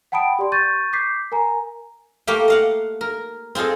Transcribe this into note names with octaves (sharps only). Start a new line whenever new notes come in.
F#5 G5 A5 B5 D#6 D7
G4 D5 C6
C#6 G6 A6 D#7
D6 G6 B6 C7
A#4 G#5 A#5
A3 A#3 G4 F5 G5
D#5 F5 F#5
A#4
C4 F4 G#4 A4 D#5